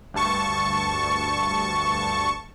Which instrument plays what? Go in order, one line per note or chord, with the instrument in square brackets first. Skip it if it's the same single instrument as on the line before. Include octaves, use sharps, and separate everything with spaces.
[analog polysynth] D2 G2 A5 C#6